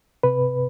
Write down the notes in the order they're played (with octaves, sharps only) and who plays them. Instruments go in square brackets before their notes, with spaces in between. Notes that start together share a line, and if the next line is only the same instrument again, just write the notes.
[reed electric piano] C3 B4